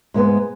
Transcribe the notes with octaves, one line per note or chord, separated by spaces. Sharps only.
G#2 G#3 B3